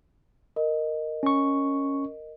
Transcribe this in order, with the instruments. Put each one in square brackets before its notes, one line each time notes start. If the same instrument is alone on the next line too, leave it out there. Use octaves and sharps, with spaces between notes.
[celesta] A#4 D#5
[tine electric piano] C#4 C#6